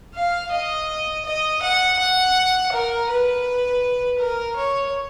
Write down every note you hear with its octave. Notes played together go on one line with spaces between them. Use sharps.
F5
D#5
D#5
F#5
F#5
A#4
B4
A#4
C#5